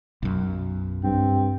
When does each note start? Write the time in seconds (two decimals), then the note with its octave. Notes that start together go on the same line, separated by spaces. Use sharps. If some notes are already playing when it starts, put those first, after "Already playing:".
0.23 B1 F#2
1.03 G2 C4